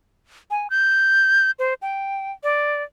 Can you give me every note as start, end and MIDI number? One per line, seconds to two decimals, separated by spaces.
0.51 0.68 80
0.70 1.51 91
1.59 1.74 72
1.82 2.32 79
2.43 2.83 74